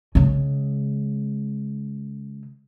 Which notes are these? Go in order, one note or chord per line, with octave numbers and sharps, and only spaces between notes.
C#3 G#3